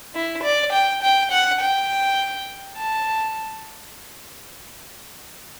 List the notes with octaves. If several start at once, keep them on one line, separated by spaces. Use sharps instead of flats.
E4
D5
G5
G5
F#5
G5
A5